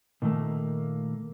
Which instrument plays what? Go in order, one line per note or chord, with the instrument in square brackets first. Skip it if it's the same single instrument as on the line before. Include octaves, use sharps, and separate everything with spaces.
[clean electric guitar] A#2 D#3 F#3 A3 A#3